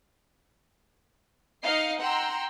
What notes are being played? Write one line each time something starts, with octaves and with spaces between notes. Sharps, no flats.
D#4 D#5 F5 F6 C7 C#7
F#5 G5 A#5 C6 E6